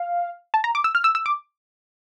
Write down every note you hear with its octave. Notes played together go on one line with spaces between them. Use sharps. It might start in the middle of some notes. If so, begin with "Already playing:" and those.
Already playing: F5
A5
A#5
D6
E6
F6
E6
E6
D6